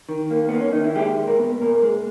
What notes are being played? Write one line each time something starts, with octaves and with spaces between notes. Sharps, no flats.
D#3
A#3
A#3 B3
C#4
D#3 D#4
E4
G#3 G4
A#2
A#4
B3
A#2 A#4
G#3